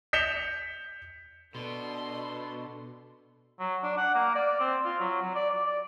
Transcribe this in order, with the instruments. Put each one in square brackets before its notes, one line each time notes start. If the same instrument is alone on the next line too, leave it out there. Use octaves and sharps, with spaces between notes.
[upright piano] G6 B6 C#7 E7 F7 G7
[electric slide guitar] B2 [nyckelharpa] D4 A4 [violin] C6
[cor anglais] F#3
D4
F#5
A#3
D5
C4
F4
F#3
F#3
D5
D5
D5